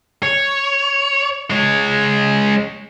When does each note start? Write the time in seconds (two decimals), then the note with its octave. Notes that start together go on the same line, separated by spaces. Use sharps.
0.23 C#5
1.50 G#3 C#5